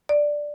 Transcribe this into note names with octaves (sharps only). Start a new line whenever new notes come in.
D5